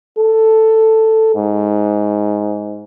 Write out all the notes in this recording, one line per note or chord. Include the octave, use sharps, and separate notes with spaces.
A4
G#2